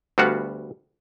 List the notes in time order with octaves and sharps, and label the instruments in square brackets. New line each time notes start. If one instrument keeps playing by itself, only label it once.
[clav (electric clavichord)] D2 G3 B3 F#4 F5 F#5